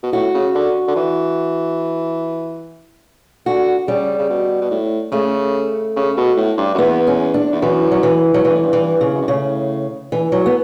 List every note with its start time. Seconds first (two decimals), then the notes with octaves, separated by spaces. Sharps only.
0.03 B2
0.12 A2 F#4
0.34 C#3
0.55 D3
0.88 D3
0.96 E3
3.46 D3 F#4
3.87 C#3 G3
4.19 C#3
4.29 B2
4.61 B2
4.71 A2
5.12 C#3 A3
5.96 C#3
6.17 B2
6.37 A2
6.57 G2
6.74 F#2
6.78 E2 B3
7.07 C#4
7.34 D4
7.52 E2
7.61 F#2 E3
7.91 F#3
8.03 E3
8.34 F#3
8.45 G2 E3
8.55 A2
8.63 G2
8.73 E3
9.01 E2 C#3
9.14 F#2
9.21 G2
9.28 A2 C#3
10.12 E3
10.32 F#3
10.46 B3